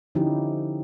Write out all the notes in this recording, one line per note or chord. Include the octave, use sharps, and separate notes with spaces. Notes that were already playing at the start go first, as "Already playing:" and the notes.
D3 F3 C#4 D#4 E4 G4